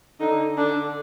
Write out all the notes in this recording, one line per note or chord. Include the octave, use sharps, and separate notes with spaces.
D3 D#4
D3 D4